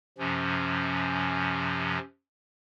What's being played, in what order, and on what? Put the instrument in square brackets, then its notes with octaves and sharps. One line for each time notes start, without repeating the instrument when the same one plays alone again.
[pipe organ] F#2 C3 F3 C#4